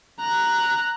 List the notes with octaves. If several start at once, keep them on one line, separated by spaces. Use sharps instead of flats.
A#5 F#6